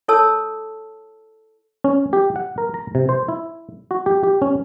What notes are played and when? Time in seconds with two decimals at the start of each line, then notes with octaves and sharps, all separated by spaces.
0.08 E4 A4 C#5 A5 E6
1.84 C#4
2.13 G4
2.36 F#5
2.58 A#4
2.74 A#5
2.95 C3
3.09 C5
3.28 E4
3.91 F#4
4.06 G4
4.23 G4
4.42 C#4